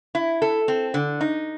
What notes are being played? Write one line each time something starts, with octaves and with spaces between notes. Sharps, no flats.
E4
A4
C4
D3
D#4